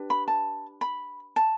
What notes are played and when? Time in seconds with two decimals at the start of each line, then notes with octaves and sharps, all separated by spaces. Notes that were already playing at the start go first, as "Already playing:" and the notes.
Already playing: D4 G4 B4
0.10 B5
0.28 A5
0.81 B5
1.36 A5